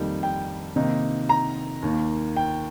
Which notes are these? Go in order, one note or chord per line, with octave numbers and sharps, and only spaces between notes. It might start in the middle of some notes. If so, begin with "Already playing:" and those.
Already playing: F2 D#3 G3 A#3 D#4
G5
C3 D#3 A#3 D#4
A#5
D#2 D#3 A#3
G5